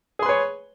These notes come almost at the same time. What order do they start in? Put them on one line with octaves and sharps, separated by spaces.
G#4 C6 B4 C#5